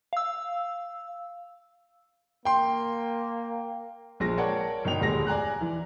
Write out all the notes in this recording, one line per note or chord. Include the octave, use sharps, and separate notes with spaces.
F5 E6
A#3 G5 C6
A#1 G#3 A#6
A#4 C#5 D5 F#5 G5 A5
G1 B2 D#4 G5 F7
D#1 D2 G#3 A#6
D5 G#5 A#5 F#6
E3